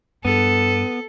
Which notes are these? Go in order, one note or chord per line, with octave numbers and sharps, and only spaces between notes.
G2 B3 A4